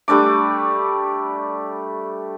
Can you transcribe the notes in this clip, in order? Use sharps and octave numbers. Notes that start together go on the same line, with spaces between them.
G3 A3 D4 D6